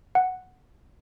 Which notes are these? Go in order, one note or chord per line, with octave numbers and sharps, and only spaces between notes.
F#5